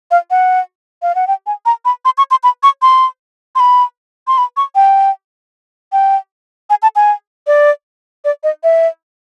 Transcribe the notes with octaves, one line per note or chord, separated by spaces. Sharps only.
F5
F#5
F5
F#5
G5
G#5
A#5
B5
C6
C#6
C6
B5
C#6
C6
C6
B5
C6
B5
C#6
G5
G5
G#5
A5
G#5
D5
D5
D#5
E5